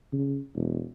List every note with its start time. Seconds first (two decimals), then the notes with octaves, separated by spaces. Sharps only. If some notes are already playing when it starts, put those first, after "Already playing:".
0.13 C#3
0.55 E1